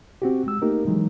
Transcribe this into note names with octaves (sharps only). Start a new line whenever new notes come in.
C4 F#4 G4
G#3 E6
A3 A#3 D#4 G4 A#4
E3 F#3 G#3 A#3 D#4